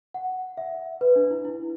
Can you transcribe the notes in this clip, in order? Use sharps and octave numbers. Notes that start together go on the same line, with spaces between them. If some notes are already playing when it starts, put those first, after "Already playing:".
F#5
E5
B4
D4
E4
E4